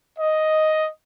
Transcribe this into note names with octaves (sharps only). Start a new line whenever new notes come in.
D#5